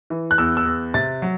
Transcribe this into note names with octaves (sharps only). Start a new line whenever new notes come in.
E3
F#6
E2 E6
E6
E2
C3 A6
F#3